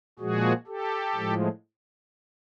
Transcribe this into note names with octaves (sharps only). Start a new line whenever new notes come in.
A#2 F3 G#3 F#4 G#4
G4 A4
A2 F3 G#3